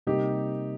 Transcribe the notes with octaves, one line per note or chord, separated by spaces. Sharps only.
C3 G3 A#3 D#4 G4